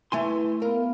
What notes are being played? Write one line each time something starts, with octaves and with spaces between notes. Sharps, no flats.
A3 E4 B4 G#5 C6
B3 A#4 F5